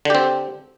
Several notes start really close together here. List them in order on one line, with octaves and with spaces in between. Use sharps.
D3 G4 C4